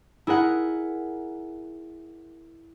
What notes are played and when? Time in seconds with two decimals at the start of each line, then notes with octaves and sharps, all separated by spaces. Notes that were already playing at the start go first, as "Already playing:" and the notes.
0.27 E4 G#4 A#4 F#5